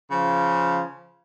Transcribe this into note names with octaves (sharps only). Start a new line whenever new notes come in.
C#3 F3